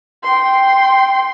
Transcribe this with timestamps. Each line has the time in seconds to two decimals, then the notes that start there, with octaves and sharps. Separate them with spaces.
0.24 G5 C6